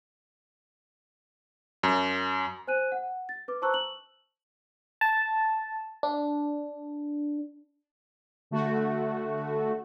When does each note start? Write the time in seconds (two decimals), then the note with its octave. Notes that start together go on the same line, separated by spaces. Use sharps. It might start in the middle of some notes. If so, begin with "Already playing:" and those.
1.83 F#2
2.67 C5 G#5 F#6 D#7
2.92 F#5
3.29 A6
3.48 B4 D6
3.62 C5 A5 A#5 C#6 E6 F#6
3.74 F#7
5.01 A5
6.03 D4
8.51 D3 A3 F#4